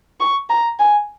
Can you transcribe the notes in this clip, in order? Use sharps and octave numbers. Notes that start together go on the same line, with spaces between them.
C#6
A#5
G#5